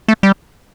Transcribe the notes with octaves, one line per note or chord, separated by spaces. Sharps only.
A3
G3